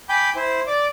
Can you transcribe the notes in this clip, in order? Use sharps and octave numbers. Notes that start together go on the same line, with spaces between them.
G5 G#5 B5 D6 G6
E4 C5
D5 D6